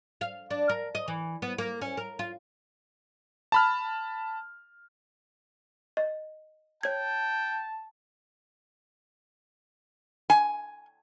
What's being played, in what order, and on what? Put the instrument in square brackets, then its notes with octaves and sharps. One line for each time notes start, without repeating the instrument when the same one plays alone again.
[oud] F5
D4
A#4
D#5
E3
B3
A#3
C#4
A#4
F4
[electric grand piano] A5 B5 F6
[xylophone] D#5
[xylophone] C#5 G#6 [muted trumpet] G5 [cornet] A5
[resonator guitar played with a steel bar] G#5